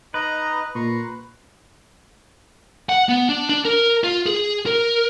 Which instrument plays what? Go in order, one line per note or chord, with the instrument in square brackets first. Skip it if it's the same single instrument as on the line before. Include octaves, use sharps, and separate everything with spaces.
[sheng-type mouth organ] D#4 D#5 A#5 [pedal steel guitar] B4
[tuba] A#2 [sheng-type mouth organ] A#5 C6 C#6
[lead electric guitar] F#5
B3
D4
D4
A#4
F4
G#4
A#4